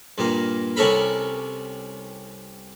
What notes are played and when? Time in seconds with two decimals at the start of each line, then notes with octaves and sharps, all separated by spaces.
0.18 G2 A#2 A#3
0.76 C2 G3 C#4 A4 A#4 B5